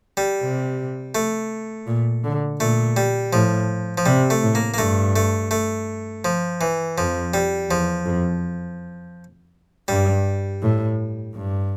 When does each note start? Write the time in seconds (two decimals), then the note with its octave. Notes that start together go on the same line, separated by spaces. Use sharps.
0.17 G3
0.42 C3
1.15 A3
1.87 A#2
2.24 D3
2.60 A#2 A3
2.97 G3
3.33 A2 F3
3.98 F3
4.06 C3 G3
4.30 A3
4.43 A2
4.55 A#3
4.74 A#3
4.78 G2 A3
5.16 A3
5.51 A3
6.25 F3
6.61 E3
6.98 F2 F3
7.34 G3
7.70 E2 F3
8.06 F2
9.88 G2 G3
10.62 A2
11.34 G2